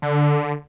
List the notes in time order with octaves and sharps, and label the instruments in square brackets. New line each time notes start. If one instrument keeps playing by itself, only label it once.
[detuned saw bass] D3